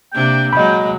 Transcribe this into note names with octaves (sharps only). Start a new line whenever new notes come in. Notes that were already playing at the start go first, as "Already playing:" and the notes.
C3 A#3 D4 G5
A#2 F#3 G#3 D#5 B5